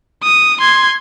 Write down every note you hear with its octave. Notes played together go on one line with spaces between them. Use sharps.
D#6
C6 G#6